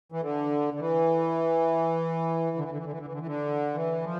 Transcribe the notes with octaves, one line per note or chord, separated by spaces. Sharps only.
E3
D3
D3
E3
D3
E3
D3
E3
D3
E3
D3
E3
D3
E3
D3
E3
F3